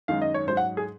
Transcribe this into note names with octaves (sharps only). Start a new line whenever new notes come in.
F#2 D#3 G#3 F5
D#5
C#5
G#2 F#3 C5
F#5
G#4